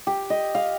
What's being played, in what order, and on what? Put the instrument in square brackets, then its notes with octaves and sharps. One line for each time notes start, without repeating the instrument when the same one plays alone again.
[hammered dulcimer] G4
D#5
F5